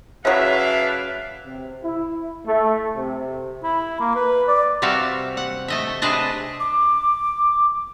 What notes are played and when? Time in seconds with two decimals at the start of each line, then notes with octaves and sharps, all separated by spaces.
0.25 C#3 F#3 D4 E4 B4 E5 F5
1.45 C3
1.83 E4
2.46 A3
2.95 C3
3.63 E4
4.00 A#3
4.15 B4
4.48 D5
4.82 C3 G3 F#4 E5 F5
5.37 F#5
5.68 A3 D#5 E5
6.02 C3 D4 G#4 B4 D#5 A5
6.60 D6